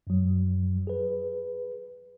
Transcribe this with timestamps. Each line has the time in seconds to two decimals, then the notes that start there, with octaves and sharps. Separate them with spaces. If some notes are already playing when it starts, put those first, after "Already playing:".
0.07 F#2 F#3
0.87 G#4 B4